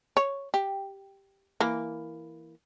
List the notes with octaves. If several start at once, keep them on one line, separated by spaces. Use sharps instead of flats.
C#5
G4
E3 A#3